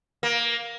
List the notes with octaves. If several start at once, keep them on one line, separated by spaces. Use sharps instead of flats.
A#3